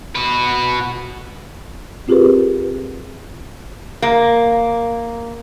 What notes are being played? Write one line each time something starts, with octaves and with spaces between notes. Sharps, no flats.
F#4 B4
C4 F4 G4 G#4 A#4 B4
A#3